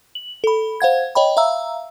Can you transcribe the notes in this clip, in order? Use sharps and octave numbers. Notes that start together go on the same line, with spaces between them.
F#7
A4 B5
C5 F5 F#5 G#6
C#5 D#5 G5 B5
E5 F5 A#5 E6